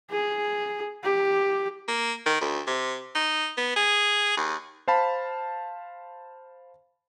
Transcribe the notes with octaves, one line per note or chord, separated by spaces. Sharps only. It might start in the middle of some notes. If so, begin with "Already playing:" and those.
G#4
G4
A#3
D#3
D2
C3
D#4
B3
G#4
D#2
C5 F5 A5 B5